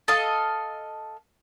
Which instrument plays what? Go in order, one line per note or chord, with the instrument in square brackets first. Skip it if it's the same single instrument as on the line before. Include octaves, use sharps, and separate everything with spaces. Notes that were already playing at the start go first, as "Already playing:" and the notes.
[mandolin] A4 D#5 F5